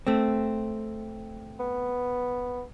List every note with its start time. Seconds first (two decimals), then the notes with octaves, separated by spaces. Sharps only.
0.07 A3 C4
1.60 B3